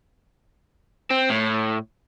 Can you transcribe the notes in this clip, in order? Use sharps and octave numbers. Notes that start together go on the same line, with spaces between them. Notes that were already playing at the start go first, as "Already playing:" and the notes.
C4
A2